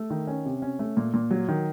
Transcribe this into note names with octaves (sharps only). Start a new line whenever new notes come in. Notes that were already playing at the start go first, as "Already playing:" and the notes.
Already playing: A3
D#3
C#4
C3
C#4
A3
A#2
A#2
F#3
D#3